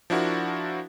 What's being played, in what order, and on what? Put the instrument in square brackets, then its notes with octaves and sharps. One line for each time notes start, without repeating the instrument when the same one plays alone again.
[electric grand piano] F3 D4 E4 F#4 A#4